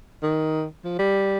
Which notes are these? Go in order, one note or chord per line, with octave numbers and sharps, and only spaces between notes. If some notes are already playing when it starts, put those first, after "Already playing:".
D#3
F3
G3